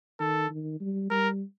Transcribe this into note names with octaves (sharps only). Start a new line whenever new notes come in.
D#3 A4
D#3
G3
G3 A#4